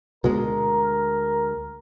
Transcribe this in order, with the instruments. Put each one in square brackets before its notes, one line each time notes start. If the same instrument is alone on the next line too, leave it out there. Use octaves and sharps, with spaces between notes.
[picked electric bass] D2 G#3 [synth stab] B2 [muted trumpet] A#4